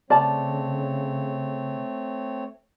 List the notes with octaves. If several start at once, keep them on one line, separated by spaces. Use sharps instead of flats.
C#3 A3 C4 C#5 D5 A5